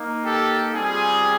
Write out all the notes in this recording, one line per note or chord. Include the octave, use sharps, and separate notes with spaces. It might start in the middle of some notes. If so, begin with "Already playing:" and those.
Already playing: A#3 D#4
G4 A4
G3 C4 F4 G#4